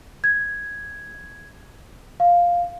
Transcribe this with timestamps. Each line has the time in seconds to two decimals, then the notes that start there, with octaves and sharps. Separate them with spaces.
0.24 G#6
2.20 F5